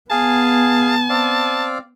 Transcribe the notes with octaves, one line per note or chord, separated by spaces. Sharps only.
B3 G#4 F5 G#5 A5
C4 D5 F5